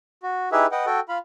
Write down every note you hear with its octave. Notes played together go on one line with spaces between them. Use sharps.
F#4
D#4 E4 G4 G#4 B4 E5
B4 D#5 F#5 G5
F#4 A4 G5
F4 F5 B5